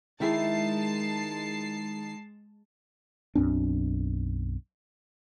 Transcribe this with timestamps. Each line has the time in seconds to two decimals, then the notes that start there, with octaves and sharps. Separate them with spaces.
0.20 D#3 G#3 E4 G#4 A5 C7
3.35 B1 F#2 C4 D4